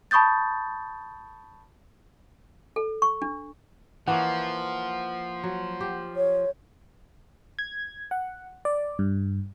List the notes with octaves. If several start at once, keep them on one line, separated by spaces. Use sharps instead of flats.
A5 B5 C#6 D#6 G6 A6
A4
C#6
D4
E3 F3 A#3 C#5 F#5
F#3
G4
C#5
G#6
F#5
D5
G2